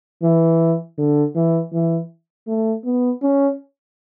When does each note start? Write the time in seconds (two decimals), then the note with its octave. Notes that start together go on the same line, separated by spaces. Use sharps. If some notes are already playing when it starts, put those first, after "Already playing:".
0.23 E3
0.98 D3
1.35 E3
1.73 E3
2.47 A3
2.85 B3
3.22 C#4